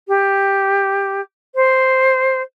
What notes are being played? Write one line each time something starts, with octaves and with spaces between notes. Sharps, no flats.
G4
C5